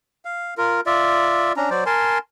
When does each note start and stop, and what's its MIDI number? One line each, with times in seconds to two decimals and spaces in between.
0.25 0.54 77
0.57 0.81 65
0.57 0.81 70
0.86 1.53 65
0.86 1.53 74
0.86 1.53 76
1.57 1.70 61
1.57 1.70 62
1.57 1.70 82
1.70 1.84 54
1.70 1.84 72
1.70 1.84 74
1.86 2.18 70
1.86 2.18 80
1.86 2.18 81
1.86 2.18 84